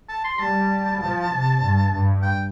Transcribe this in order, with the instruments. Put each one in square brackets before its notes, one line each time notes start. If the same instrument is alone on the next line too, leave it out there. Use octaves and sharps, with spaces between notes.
[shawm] A5
C6
[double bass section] G3 [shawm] A5
[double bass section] F3
C3
G2
G2
[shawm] G5